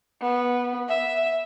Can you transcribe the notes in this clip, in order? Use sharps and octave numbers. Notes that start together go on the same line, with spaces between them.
B3
E5